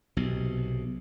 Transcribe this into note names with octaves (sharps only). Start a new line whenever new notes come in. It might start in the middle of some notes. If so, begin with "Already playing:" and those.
B1 C3